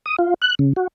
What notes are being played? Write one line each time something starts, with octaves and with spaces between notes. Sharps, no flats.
D#6
F4
F#6
C#3
F#4